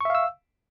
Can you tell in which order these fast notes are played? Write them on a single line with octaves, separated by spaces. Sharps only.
C#6 E5 F5 E6